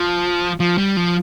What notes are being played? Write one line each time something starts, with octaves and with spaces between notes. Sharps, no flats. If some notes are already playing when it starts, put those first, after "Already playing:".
Already playing: F3
F3
G3
F3